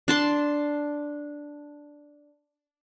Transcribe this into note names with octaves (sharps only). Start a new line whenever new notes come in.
D4 A5 C6